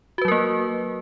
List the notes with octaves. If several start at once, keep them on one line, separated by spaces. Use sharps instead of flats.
F#3 A#3 F#4 A#4 B4